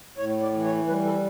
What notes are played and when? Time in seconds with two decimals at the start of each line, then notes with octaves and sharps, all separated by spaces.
0.18 A2 C#5
0.41 D5
0.53 E3
0.64 C#5
0.87 G3 B4
1.05 A4